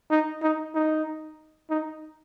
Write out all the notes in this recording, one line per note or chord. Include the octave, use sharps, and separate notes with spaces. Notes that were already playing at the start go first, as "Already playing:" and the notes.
D#4
D#4
D#4
D#4